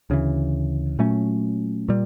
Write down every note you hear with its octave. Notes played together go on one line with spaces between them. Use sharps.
D2 C#3 E3
A#2 F#3 A3 C#4
A#2 G3